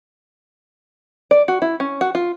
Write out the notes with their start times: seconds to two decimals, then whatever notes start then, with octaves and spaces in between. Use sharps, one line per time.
1.31 D5
1.48 F#4
1.62 E4
1.80 C#4
2.01 F#4
2.15 F4